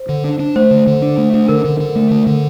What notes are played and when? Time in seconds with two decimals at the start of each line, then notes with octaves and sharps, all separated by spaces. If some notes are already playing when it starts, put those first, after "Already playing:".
Already playing: C5
0.09 D3
0.24 D4
0.39 D4
0.56 A3 C5
0.71 D3
0.87 D3
1.02 D4
1.18 A3
1.34 D4
1.48 D3 A#4
1.65 D3
1.80 D3
1.96 A3
2.11 D3
2.27 D3